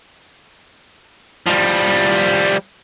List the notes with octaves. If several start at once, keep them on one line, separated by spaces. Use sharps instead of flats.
F3 G3